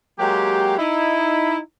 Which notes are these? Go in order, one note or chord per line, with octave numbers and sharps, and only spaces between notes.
F#3 G#3 A#3 G4
D#4 E4